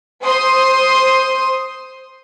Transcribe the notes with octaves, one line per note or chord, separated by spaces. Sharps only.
C5 C6 D#6